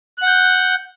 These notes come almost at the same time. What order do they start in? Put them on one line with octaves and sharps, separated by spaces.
F#6 F#5 G6